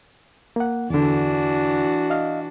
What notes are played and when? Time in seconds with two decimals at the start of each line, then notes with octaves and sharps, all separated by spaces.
0.56 A#3 F#5
0.90 E2 D3 E3 D4 F#4
2.10 D#5 F5